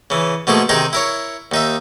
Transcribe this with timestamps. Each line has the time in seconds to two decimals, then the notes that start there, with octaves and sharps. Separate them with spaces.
0.10 C#3 E3
0.47 B2 F3 A3 A#3 G#4
0.69 C3 D#3 D#4 G#4 D#5
0.93 E4 A#4 C#5
1.52 D#2 D#4 E5